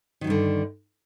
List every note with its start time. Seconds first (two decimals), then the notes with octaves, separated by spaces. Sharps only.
0.21 D#3
0.24 F#3
0.27 G2
0.30 D3